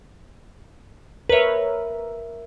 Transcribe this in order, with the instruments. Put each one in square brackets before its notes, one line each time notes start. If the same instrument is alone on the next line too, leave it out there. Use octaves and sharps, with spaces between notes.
[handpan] A#4 E5 [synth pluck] B4 C#5